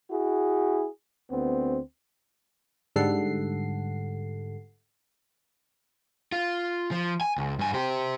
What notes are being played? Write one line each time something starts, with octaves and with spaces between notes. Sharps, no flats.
E4 F#4 G#4
D2 B3 C4
G#2 D3 G3 A4 F#5 C7
F4
F3
G#5
C#2
G2 G#5
G4 C5